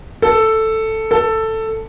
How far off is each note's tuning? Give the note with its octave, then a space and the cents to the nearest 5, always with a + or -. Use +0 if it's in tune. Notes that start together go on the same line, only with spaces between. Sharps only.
A4 +5
A4 +10